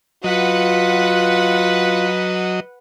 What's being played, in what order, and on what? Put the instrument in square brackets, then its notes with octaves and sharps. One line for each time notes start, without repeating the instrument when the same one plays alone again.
[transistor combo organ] F#3 D#5 [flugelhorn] F4 [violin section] B4 F#5